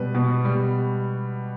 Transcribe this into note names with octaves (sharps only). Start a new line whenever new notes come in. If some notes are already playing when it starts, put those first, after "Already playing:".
Already playing: B2 G3 B4
B2
G3